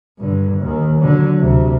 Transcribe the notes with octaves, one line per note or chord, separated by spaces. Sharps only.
G2 D3
D#2 D#3
D3 F#3
D2 C3